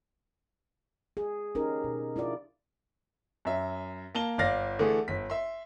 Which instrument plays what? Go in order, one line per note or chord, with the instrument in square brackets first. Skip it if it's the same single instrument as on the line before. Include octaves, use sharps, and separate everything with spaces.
[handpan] G#4
C#4 D#4 G4 A#4 C5
B2
D4 E4 F4 D5
[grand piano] F#2 E5
A#3 A5 G7
G1 D5 F5 A6 A#6
D3 E3 A3 G#4
G1 B6
E5 C6